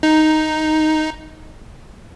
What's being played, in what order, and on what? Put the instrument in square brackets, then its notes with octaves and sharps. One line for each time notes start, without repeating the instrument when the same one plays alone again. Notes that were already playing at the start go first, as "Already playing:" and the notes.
[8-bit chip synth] D#4